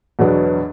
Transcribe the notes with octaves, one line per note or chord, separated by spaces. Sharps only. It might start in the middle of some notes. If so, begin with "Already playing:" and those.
E2 B2 F#3 B3 D4